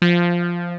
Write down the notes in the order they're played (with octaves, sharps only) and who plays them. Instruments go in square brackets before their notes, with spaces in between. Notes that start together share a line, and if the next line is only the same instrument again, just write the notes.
[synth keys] F3